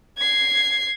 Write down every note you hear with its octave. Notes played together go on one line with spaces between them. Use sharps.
G#6 C7